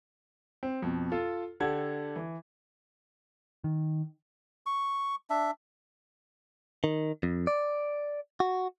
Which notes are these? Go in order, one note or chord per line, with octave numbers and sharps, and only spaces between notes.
C4
F2 B2
F4 A4
D3 G4 A4 F#5 G#6
E3
D#3
C#6
D4 E5
D#3
F2
D5
F#4